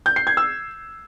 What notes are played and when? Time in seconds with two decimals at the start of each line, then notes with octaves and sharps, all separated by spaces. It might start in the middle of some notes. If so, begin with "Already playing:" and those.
0.06 G6
0.16 C7
0.27 G#6
0.37 E6